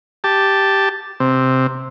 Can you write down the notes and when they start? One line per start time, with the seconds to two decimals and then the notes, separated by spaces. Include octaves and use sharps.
0.24 G4 A5
1.20 C3